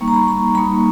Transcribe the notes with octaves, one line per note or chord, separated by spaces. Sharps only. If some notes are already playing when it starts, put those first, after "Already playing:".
G3 A#3 D#4 C#6
A#5
B5
C#6
B5
G3 A#3 D#4 B5